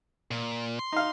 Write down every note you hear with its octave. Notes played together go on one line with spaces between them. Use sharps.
A#2
C6
D#4 F5